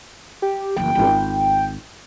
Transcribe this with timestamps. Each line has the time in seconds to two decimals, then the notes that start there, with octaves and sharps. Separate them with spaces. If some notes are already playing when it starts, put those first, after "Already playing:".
0.42 G4
0.77 F#1 E3 G5
0.95 G#1 F4